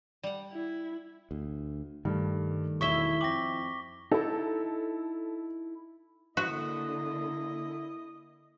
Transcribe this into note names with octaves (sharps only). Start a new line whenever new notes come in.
G3 F#5
E4
D2
G2 D#3 G3 A3
E1 E4 D#5 E5 C#6 B6 G7
F2 G5 D6 A#6 F#7
D#4 E4 A4
D3 A#3 E4 F#4 D#5